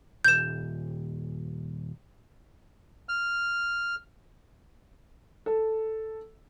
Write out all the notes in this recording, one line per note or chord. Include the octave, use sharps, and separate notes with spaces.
D#1 G6 E7
F6
A4